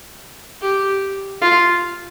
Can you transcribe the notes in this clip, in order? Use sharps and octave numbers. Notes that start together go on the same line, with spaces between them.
G4
F4